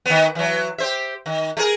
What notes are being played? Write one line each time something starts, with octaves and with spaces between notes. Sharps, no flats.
D#3 B3
E3 F#3
G4 C5 E5
D#3
A3 G#4 A#4